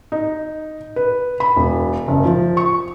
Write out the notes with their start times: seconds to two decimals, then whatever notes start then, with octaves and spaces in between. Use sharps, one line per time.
0.12 D#4
0.96 B4
1.40 B5
1.56 E1
2.08 F#1
2.25 F3
2.57 C#6